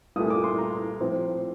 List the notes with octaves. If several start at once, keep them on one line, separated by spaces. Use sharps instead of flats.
C2 A#2 A3 D#6
D6
C6
A#5
A2 F3 C4